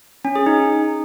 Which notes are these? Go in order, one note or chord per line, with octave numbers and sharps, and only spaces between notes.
C#4
G#4
D#4